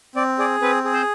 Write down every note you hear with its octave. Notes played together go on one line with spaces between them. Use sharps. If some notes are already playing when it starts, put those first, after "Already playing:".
C4 D5
G#4 D5
C4 B4
G#4
C5